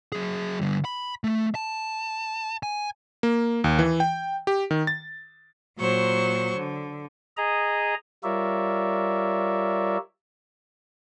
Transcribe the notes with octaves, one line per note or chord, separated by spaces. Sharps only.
F#3 G#4
D3 G3
B5
A3
A5
G#5
A#3
D#2
E3
G5
G4
D#3
A6
A#2 F#3 C5 C#6
D3
G#4 D#5 A#5
G3 F4 A#4 C#5 D5 E5